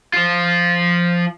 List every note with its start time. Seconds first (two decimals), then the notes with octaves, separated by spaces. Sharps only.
0.13 F3 F4